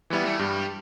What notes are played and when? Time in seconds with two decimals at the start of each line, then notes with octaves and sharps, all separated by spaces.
0.10 E3 G3 B3 E4
0.26 A3
0.39 G2 G3